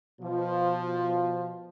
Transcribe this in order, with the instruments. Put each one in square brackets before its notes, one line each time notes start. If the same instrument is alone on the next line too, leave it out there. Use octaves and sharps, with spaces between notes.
[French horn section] B2 F3